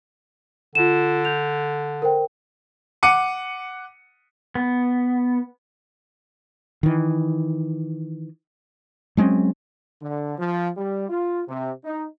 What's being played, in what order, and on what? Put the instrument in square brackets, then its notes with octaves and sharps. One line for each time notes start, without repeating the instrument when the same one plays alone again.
[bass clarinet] D3 [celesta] F4 E7
[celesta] G6 F7
A#4 C5 G5
[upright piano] F#5 D6 C#7 D#7
[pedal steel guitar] B3
[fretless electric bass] D#3 E3
F#3 G#3 C4 C#4
[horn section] D3
F3
G3
F4
C3
D#4